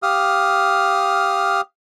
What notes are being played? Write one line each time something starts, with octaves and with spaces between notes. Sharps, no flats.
G4 F5 D#6 F6